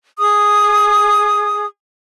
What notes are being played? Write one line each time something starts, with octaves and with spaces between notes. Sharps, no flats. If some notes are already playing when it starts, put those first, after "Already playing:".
G#4 D#6